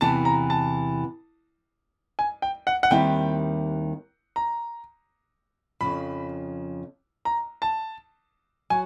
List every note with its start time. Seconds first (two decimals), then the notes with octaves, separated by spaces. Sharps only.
0.01 E2 C3 E3 A5
0.25 A#5
0.50 A5
2.19 G#5
2.42 G5
2.67 F#5
2.83 F#5
2.90 D#2 D#3 G3 C4 E4 G5
4.36 A#5
5.81 F2 C#3 F3 B5
7.25 A#5
7.62 A5
8.70 F#3 G#5